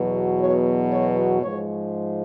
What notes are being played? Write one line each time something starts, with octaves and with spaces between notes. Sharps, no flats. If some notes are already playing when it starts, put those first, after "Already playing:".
Already playing: E2 B2 F#3
C#5
C#5
G#2 F3 G#3 C#5